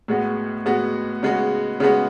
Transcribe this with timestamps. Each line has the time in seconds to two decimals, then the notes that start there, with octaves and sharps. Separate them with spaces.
0.08 A2 G#3 B3 F#4
0.66 A2 G#3 B3 F#4
1.23 C#3 G#3 B3 F#4
1.80 C#3 G#3 B3 F#4